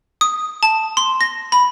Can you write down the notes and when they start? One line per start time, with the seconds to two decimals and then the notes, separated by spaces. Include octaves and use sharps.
0.21 D#6
0.63 A5
0.97 C6
1.21 A#6
1.52 B5